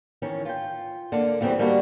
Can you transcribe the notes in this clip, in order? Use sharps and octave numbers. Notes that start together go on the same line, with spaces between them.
D#3 E3 C#4
F4 G5
D3 A#3
E2 E3 G3 C4 G#4 C#5
D#3 G3 A#3 D4 F#4 B4